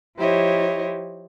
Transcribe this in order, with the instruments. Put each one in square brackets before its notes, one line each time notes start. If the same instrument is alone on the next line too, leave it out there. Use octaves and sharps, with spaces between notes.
[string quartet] F3 E4 G4 C5 C#5 D#5